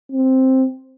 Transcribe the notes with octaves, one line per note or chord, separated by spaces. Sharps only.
C4